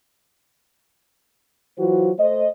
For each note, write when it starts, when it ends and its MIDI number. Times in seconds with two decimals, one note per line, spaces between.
1.78 2.10 52
1.78 2.10 54
1.78 2.10 65
1.78 2.10 66
1.78 2.10 72
2.18 2.47 57
2.18 2.47 72
2.18 2.47 75